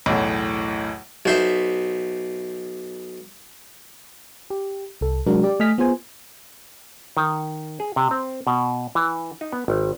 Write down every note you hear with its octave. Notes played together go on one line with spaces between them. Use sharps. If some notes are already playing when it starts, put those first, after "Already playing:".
B1 E2 A2
B1 C5 E5
G4
C2 A4
C3 F#3 G#3 D4 F#4 A#4
G4 D5
A3 D#5 G#5 F6 B6
B3 F4 G#4 C5 G#5
D#3
G#4
C3
C4
B2
E3
D#4
B3
G#1